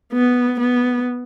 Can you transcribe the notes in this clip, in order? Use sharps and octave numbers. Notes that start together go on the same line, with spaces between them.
B3
B3